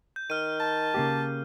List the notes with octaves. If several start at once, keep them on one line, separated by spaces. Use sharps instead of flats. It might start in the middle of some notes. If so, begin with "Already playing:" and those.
G6
D#3 F6 D#7
A5
C#3 A#3 G4